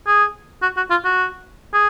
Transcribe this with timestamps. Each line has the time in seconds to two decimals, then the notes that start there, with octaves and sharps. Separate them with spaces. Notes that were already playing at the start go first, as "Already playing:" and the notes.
0.07 G#4
0.62 F#4
0.77 F#4
0.90 F4
1.05 F#4
1.74 G#4